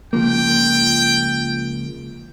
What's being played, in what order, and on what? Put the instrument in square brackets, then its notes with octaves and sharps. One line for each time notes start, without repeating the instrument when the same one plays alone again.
[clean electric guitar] C#2 F3 A#3 [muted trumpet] G5